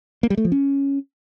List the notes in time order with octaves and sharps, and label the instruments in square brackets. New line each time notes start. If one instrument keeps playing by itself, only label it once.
[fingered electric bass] A#3
G3
A3
F3
C#4